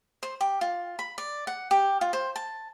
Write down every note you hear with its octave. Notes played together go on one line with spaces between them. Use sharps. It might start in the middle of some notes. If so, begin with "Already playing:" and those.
C5
G4
F4
B5
D5
F#5
G4
F4
C5
A5